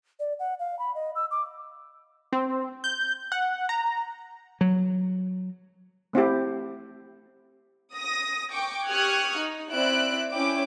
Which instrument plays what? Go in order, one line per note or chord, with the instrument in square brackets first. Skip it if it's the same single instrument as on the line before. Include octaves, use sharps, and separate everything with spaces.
[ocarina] D5
F#5
F5
B5
D#5
E6
D6
[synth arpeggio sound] C4
G6
F#5
A#5
[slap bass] F#3
[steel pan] A3 C4 E4 G4
[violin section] D#6 A#6
G5 C#6 D6
G4 C#6 D#6 F6 F#6 G#6
D#4
C4 E4 D5 E5 F#6 D7
C#4 E4 G5 D6